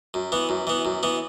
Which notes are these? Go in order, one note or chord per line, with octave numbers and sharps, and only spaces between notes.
F#2
E3 B3
F#2
E3 B3
F#2
E3 B3